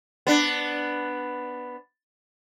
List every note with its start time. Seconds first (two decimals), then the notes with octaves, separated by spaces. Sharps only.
0.27 B3 D4